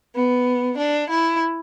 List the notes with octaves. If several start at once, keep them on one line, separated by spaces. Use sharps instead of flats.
B3
D4
E4